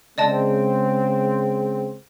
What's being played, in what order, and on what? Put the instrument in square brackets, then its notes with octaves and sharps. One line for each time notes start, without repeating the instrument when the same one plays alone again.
[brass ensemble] C#3 G#3 C4 [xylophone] D5 D#5 A5